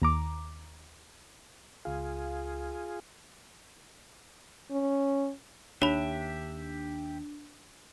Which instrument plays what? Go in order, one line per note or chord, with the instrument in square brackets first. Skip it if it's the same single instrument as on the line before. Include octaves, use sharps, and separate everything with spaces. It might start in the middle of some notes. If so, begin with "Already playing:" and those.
[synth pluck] D#2 A#5 D6
[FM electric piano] C#2 F5 [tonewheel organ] F4 G#4
[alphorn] C#4
[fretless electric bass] D#2 [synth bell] D4 [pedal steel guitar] G4 E5 [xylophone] C#5 B5